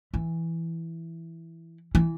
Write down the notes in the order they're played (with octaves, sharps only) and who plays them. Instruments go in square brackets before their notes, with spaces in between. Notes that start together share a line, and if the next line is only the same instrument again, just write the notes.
[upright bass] E3
E3